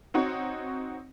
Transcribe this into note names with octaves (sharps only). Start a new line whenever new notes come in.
C4 D#4 F#4 C#5